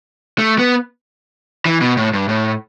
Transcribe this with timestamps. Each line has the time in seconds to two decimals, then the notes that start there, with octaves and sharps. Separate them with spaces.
0.39 A3
0.59 B3
1.65 E3
1.81 B2
1.97 A2
2.14 G2
2.29 A2